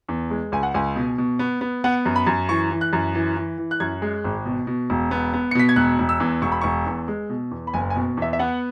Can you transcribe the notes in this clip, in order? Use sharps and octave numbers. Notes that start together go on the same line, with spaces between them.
E2
G#3
C#2 G#5
F#5
C#2 G#5
B2
B2
B3
B3
B3 F#5
F#2
B5
F#2
E3 C#6
E3
F#6
F#2
E3
E3
E3
F#6
F#2 G#6
G#3
G#1
B2
B2
E1
B3
B3
C#7
B2 B6
G#6
E1 F#6
E1
E6
E2
E1 C#6
B5
E1 C#6
E2
G#3
B2
E2
B5
F#1 G#5
G#5
B2
E2 E5
E5
B3 F#5